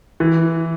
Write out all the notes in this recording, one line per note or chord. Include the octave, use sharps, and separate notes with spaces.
E3